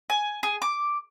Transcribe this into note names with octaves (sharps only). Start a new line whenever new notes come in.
G#5
G#4
D6